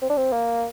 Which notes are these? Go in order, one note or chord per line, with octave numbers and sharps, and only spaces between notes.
C4
D4
C4
A#3